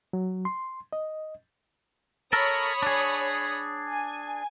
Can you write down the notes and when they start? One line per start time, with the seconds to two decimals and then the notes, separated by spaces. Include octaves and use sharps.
0.13 F#3
0.45 C6
0.93 D#5
2.33 A4 A#4 C#5 B5 D#6
2.82 D4 G#4
3.91 G#5